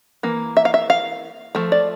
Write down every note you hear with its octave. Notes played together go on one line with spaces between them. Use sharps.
E3 A#3
E5
F5
E5
F5
F3 A3
D5